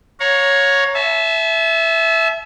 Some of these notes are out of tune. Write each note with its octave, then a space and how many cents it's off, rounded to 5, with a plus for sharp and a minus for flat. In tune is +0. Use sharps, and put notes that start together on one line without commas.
C#5 +0 F5 +45 A#5 +0
E5 +0 A5 -40